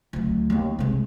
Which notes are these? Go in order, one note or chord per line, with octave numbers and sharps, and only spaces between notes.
D2 F#3
D#2 A#3
C3 G#3